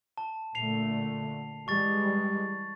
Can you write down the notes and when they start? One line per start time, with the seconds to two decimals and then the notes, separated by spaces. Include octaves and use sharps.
0.18 A5
0.55 A#2 D3 A3 C7 F7
1.68 E3 G3 G#3 C#6 A6